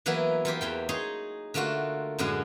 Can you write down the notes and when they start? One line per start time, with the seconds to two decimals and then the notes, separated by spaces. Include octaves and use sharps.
0.06 E3 F#3 A#3 B3 E4
0.45 E3 F4 G4 C5
0.61 E2 E3 G5
0.89 D#4 G#4 C#5 C6
1.54 D3 A3 A#3 F4 F#4
2.19 F#2 A2 D3 G#3 C#4 F#4